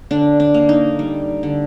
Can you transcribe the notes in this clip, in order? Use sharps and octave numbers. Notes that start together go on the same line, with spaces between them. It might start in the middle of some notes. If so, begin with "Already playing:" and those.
D3 D4
D4
A#3
D#4
G3
D3